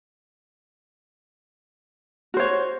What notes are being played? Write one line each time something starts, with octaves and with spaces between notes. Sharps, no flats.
F#4 C5 C#5